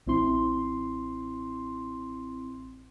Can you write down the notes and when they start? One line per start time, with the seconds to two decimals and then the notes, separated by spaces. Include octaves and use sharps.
0.06 A1 C4 E4 C6